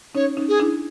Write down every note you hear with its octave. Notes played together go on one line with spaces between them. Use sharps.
C#4 D#4 C#5
C#4 D#4
G#4
D4 E4